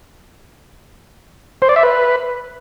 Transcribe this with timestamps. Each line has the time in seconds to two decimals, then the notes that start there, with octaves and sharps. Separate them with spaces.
1.62 C5
1.69 D5
1.76 E5
1.83 B4